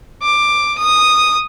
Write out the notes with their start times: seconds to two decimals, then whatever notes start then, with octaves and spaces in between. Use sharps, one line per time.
0.23 D6
0.78 D#6